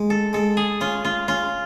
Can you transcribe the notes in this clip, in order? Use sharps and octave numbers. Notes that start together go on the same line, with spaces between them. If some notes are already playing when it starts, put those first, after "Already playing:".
Already playing: G#3
A4
G#3 A4
G#4
C#4 F4
F4
C#4 F4